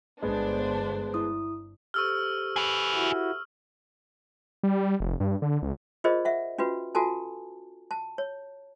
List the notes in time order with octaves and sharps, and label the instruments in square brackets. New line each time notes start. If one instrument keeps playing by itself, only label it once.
[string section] G1 D4 C5 [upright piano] G#3 B3
[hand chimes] E4 D#6
[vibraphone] G4 A4 C5 [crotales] C#6 E6 F6
[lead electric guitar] G#4 B4
[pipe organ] E4 F#4
[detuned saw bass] G3
F1
G2
D3
C#2
[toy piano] F4 G#4 A#4 C5 D5 D#5
E5 F#5
C#4 F4 F#4 B4
F4 F#4 A4 G#5 A5
A5
C#5